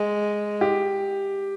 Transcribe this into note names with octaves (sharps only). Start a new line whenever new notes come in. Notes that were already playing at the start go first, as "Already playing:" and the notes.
Already playing: G#3
G4